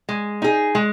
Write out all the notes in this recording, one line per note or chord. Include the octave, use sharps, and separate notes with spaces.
G#3
D#4 G#4
G#3